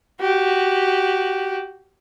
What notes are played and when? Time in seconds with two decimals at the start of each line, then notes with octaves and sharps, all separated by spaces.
0.21 F#4 G4